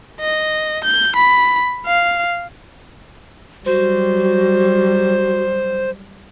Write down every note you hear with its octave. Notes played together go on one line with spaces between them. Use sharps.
D#5
G6
B5
F5
F#3 G3 F#4 C5